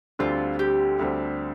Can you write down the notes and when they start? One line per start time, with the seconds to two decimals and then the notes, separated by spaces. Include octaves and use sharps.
0.19 D2 D3 G3 C4 F4
0.59 G4
0.99 D2 D3 G3 C4